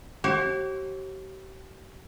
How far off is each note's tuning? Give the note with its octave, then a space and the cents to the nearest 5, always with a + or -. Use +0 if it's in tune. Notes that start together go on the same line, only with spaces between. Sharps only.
G4 -40 C#5 -45